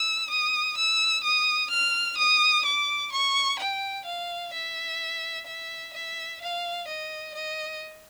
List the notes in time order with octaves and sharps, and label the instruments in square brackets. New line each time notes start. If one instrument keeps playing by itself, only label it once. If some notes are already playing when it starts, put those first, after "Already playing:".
Already playing: [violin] E6
D#6
E6
D#6
F6
D#6
D6
C#6
G5
F5
E5
E5
E5
F5
D#5
D#5